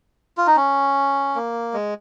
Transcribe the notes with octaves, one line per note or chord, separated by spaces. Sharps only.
F4
D#4
C#4
A#3
G#3